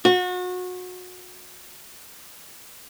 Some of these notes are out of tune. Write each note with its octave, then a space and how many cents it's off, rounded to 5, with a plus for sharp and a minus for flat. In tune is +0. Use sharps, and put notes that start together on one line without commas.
F#4 -30